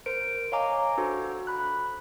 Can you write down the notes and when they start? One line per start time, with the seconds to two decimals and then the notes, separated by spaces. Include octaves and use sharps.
0.06 A#4 C5 D7
0.52 C#5 D#5 F5 G#5 A#5 D6
0.97 D4 F#4 A4 C5
1.47 B5 F#6